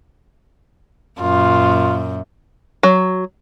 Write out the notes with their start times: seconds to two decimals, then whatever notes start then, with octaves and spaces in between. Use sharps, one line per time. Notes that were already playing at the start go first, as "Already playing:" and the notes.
1.21 F#2 A#2 F4
2.83 F#3